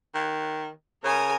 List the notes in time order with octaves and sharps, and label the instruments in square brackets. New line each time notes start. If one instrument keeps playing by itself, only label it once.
[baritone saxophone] D#3
[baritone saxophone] C#3 [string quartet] A#4 G#5 D#6